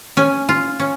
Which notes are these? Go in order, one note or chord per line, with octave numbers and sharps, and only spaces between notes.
C#4 G#5
F4
C#4